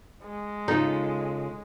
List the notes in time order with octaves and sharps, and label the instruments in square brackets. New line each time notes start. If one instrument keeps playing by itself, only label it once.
[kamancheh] G#3
[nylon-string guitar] C#3 F4 A4 [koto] D#4